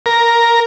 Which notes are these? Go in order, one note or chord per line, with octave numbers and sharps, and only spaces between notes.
A#4